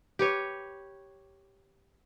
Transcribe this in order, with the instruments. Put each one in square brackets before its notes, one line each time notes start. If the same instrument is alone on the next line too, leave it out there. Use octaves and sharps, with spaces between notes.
[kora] G4 B4 C#5